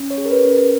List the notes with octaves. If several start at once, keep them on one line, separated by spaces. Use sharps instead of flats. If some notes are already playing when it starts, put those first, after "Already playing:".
Already playing: C#4
C#5
G#4
A#4
B4
C#4
A#4